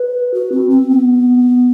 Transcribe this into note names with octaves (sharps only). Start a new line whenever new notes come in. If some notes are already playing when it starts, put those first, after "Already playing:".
Already playing: B4
F#4
C4
C4
B3